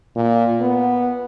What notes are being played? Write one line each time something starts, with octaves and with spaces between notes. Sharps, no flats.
A#2
B3